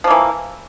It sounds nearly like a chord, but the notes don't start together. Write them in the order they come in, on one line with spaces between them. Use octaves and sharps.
F3 A#3 E3